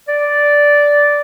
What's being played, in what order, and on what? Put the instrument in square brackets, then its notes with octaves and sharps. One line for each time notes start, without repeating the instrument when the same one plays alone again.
[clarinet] D5